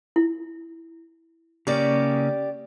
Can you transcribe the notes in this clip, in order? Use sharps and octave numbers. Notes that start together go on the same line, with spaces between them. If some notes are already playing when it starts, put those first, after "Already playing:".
E4
C#3 A#3 C#4 G4 D5